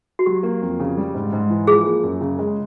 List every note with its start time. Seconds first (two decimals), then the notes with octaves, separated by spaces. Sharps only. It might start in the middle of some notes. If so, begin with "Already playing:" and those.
0.19 F#4
0.26 F#3 G4
0.43 A#3
0.62 F2
0.79 C#3
0.97 G3
1.14 G#2
1.33 G#2
1.50 E3
1.67 F3 G#4
1.86 A#3
2.03 F#2
2.21 C#3
2.39 G#3